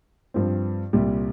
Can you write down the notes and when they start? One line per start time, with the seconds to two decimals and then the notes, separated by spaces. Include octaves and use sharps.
0.34 G2 F3 C4
0.93 C2 A#2 G3